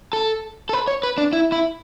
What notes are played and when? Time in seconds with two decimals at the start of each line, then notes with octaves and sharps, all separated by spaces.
0.13 A4
0.69 A4
0.73 B4
0.88 C#5
1.03 B4
1.18 D4
1.33 E4
1.52 E4